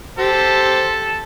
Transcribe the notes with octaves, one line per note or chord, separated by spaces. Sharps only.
G4 A4 C5